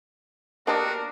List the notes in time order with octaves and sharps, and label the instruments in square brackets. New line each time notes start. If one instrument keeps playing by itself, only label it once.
[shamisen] A#3 G4 D#5 [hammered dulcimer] D4 [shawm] F#4 [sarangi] A#4